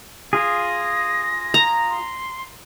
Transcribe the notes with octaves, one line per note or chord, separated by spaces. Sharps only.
F4 G#4 A#6
A#5
C6